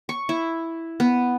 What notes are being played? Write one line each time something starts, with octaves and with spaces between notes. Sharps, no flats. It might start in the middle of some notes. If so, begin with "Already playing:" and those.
C#6
E4
B3